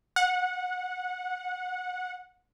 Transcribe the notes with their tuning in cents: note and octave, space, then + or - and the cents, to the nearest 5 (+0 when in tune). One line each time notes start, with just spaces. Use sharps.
F#5 -20